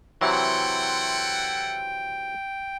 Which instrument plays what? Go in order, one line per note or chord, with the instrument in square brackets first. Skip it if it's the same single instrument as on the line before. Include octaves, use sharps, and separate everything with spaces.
[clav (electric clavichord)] C3 E3 F#3 [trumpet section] E4 A4 F#5 [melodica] G5 [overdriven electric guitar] C6